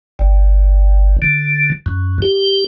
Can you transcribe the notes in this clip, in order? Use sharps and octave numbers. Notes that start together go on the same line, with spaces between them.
G1
D3
F#2
G4